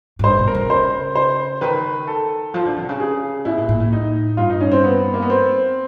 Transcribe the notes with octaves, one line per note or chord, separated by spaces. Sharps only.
G#2
G2 C5
B2
A#4
C#3
C5
C5
D#3 B4
A4
F3
D3
C3
C#3
G#4
B2 E4
A#2
A#2
A2
D#4
G2 F4
D#4
C#4
C4
B3
A#3
B3
C4